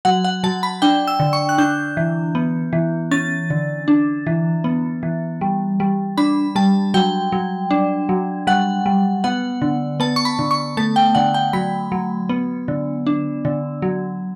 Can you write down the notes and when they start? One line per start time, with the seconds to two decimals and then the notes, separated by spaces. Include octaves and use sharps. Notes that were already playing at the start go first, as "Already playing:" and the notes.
0.05 F#3 F#5
0.24 F#5
0.43 F#3 A5
0.63 B5
0.82 D4 G5
1.08 E6
1.20 D3
1.33 C#6
1.49 F#6
1.58 D4 G6
1.97 E3
2.35 B3
2.73 E3
3.11 C#4 A6
3.50 D3
3.88 D4
4.27 E3
4.64 B3
5.03 E3
5.41 G3
5.80 G3
6.17 D4 B5
6.56 G3 A5
6.94 F#3 G5
7.32 F#3
7.71 D4
8.09 F#3
8.47 G3 F#5
8.86 G3
9.24 B3 F#5
9.62 D3
10.00 B3 A5
10.16 C#6
10.25 B5
10.39 D3
10.51 C#6
10.77 A3 A5
10.96 G5
11.15 D3 F#5
11.34 G5
11.53 F#3 B5
11.92 F#3
12.29 B3
12.68 D3
13.06 D4
13.45 D3
13.82 F#3